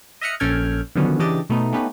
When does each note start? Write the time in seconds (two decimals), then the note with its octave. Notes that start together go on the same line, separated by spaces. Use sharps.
0.21 D#5 E5 D#6 F6 F#6 C#7
0.40 A#1 C#4 A4 G5 F6 G#6
0.95 D3 D#3 F3 F#3 B3 C#4
1.19 C#3 E3 D4 G4 D#5 A6
1.50 B2 A3 B3 D#4
1.73 A3 B3 C#4 D#4 G4 B4